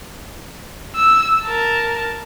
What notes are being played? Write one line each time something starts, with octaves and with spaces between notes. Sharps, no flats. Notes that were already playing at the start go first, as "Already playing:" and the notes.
E6
A#4 A5